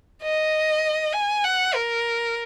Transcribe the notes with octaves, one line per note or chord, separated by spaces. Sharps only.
D#5
G#5
F#5
A#4